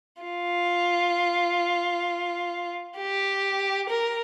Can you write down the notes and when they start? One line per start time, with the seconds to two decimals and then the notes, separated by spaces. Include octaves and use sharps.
0.22 F4
2.97 G4
3.89 A#4